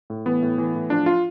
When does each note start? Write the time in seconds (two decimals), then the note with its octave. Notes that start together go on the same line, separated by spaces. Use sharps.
0.10 A2
0.26 E3 B3
0.42 A2
0.58 E3
0.74 A2
0.90 F3 D4
1.06 F4